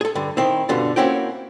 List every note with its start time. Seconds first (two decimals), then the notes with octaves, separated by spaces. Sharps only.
0.01 G#4 A4
0.15 G2 D3
0.37 D#3 C4 E4
0.69 G2 B2 D3 F4
0.96 A#3 C4 C#4 E4 F#4 G5